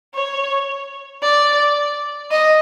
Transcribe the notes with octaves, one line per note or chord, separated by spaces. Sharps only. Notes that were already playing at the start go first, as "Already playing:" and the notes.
C#5
D5
D#5